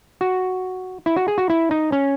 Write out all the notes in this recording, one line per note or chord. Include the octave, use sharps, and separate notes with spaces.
F#4
E4
F#4
G#4
F#4
E4
D#4
C#4